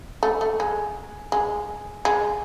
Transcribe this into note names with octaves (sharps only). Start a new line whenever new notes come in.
A3
A3
G#3
G#3
G#3